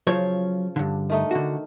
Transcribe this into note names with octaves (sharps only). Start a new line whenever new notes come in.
C#3 F3 F#3 C5 C#5
G2 D3
D#3 A3 D#4
D3 F#4